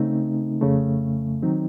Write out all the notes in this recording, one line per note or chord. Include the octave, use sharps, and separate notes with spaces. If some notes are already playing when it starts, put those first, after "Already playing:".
Already playing: C#3 A3 C4 D#4
F2 C#3 A3
D#3 F#3 C4 D#4